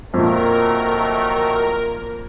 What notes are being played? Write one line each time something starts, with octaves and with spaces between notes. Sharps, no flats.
F2 A#2 D#3 F#3 A3 A#4